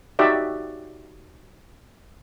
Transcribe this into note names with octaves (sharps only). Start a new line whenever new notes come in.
D#4 F#4 G4 D5 E5